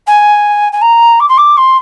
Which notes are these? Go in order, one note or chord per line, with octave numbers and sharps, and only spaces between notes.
G#5
G#5
A#5
D6
C6
D6
C6